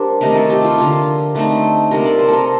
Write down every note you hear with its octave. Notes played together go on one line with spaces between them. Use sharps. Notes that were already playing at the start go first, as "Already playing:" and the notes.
Already playing: G3 A#3 D4 C5
C3 D#3 A3 D#4 A#4
A4
G4
F4
D3 F3 A#3 F4
D3 A3 C4 D#4
C3 G3 A#3 A#4
D5
C5
A4
A#4